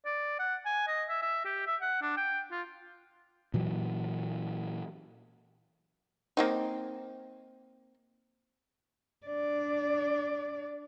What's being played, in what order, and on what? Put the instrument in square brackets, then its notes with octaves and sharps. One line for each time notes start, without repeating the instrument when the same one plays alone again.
[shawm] D5
F#5
G#5
D#5
E5
E5
G4
E5
F#5
D4
G5
F4
[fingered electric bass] A#2 E3 F#3
[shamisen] A#3 C4 D#4
[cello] D4 D5